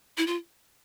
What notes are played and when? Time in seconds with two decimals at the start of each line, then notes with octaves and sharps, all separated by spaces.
0.17 E4
0.27 F4